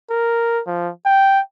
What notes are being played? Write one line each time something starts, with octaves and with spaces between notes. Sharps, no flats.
A#4
F3
G5